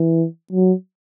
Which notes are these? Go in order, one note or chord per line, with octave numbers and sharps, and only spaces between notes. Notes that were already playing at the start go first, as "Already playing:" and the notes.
Already playing: E3
F#3